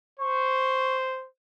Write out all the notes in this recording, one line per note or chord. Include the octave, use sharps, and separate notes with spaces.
C5 C#6